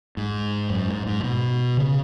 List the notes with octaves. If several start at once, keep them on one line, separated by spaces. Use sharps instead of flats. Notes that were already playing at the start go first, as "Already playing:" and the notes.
G#2
F#2
G#2
G#2
B2
C#3